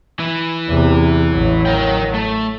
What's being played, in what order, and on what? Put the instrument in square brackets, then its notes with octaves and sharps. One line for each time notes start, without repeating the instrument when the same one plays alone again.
[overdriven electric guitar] E3 E4
[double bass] E2 C3
A1 F#3
[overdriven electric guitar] A#4 G5
A3